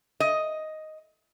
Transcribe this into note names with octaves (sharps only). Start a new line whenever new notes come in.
D#5